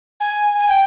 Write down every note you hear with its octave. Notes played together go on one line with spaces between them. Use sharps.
G#5
G#5
G5